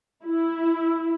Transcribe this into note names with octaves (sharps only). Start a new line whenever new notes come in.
E4